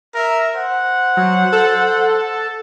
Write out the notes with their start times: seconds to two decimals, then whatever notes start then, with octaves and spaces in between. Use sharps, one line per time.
0.15 A#4 E5
0.56 C5 F#5
1.17 F#3
1.52 A4